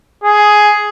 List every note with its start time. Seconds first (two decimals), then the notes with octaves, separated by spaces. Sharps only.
0.24 G#4